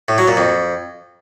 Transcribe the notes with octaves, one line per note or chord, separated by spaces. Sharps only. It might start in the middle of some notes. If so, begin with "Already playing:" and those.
A2
F#3
A#2
F2